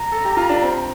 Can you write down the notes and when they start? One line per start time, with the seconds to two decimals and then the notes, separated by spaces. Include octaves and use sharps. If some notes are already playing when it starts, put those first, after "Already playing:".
Already playing: A#5
0.12 A4
0.25 G4
0.37 F4
0.49 D4
0.63 C4